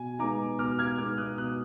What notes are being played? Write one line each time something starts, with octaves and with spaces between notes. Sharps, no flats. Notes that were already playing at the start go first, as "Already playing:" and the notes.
Already playing: B2 G#5
G#3 B3 D#4 A#5 D6
B2 D6 F6
F6 G#6
G#3 B3 D#4 D6 F6
D#6 F#6
B2 D#6 F#6